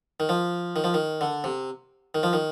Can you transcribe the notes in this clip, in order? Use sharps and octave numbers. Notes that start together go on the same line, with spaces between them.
D#3
F3
D#3
F3
D#3
D3
C3
D#3
F3
D#3